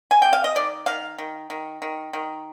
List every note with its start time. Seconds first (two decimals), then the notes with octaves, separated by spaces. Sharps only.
0.11 G#5
0.22 C3 G5
0.33 F5
0.44 D#5
0.55 D#3 D5
0.86 D#3 F5
1.18 D#3
1.50 D#3
1.82 D#3
2.13 D#3